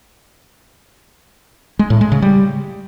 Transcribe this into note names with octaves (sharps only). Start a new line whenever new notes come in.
G#3
A2
G#3
C#3
G3